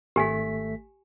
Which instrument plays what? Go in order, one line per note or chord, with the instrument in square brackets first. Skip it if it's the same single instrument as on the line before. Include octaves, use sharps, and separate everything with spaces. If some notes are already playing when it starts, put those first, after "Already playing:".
[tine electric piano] G#1 A3 B6 [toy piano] G4 G#5